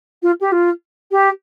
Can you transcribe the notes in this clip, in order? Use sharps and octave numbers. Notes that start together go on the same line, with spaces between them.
F4
G4
F4
G4